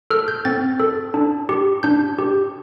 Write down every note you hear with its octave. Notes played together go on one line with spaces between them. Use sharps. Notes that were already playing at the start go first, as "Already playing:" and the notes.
A4 F6
G6
C4 A6
A4
D4
G4
D4 G6
G4